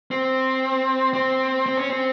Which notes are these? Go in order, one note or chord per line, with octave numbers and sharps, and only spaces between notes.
C4
C4
C4
C#4
C4